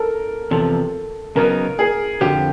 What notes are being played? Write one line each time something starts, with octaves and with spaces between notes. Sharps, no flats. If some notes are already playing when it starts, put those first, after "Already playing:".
Already playing: A4 A#4
E2 C3 F3 A4
C#3 F#3 B3 D#4 A#4
G#4
F2 D3 F3 G4